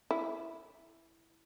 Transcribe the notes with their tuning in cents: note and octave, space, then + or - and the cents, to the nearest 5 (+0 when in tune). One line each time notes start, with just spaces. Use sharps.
E4 +0